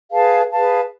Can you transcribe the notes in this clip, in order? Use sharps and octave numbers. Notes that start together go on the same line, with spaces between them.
G#4 B4 F5 A5
G#4 B4 F5 A5